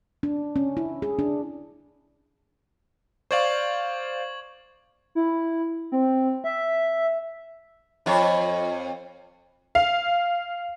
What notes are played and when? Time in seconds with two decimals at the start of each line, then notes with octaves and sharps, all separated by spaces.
0.23 D4
0.56 C#4
0.77 E4
1.02 G#4
1.19 D4
3.31 C5 D5 F5 C#6 G#6 F#7
5.15 E4
5.92 C4
6.44 E5
8.06 F2 F4 C#5
9.75 F5